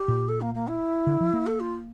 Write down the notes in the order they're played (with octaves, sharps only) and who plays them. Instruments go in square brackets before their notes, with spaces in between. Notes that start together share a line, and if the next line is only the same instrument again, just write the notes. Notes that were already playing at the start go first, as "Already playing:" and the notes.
Already playing: [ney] G4
[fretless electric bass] A#2
[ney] A4
A#3
A#3
E4
[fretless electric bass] D3
F3
A#3
[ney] A4
F4